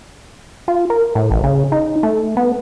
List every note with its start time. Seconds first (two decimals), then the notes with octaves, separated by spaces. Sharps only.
0.68 F4
0.90 A#4
1.15 A2
1.31 A1
1.44 C#3
1.72 D#4
2.03 A3
2.37 B3